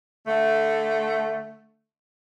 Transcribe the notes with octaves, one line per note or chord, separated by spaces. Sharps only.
D3 A3